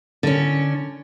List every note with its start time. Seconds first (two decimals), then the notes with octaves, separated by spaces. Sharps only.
0.23 D3 C#4